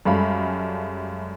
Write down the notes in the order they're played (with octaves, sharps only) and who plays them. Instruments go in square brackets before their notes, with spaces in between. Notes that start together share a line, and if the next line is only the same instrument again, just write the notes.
[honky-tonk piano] F#2 G3 G#3 A4 F5 B5